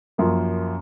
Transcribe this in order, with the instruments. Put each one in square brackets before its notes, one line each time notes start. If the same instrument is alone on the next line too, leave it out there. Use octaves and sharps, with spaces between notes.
[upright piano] F#2 F3 A#3